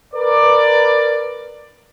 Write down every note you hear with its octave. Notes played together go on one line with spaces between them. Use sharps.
A#4 B4 D5